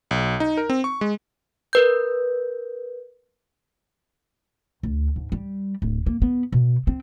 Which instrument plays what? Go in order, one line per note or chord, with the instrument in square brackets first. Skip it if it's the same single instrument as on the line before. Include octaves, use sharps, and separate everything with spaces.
[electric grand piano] B1
D#4
A#4
C4
C#6
G#3
[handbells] A#4 B4 G6
[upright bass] D2
G#2
G3
D1
A#3
B3
B2
C4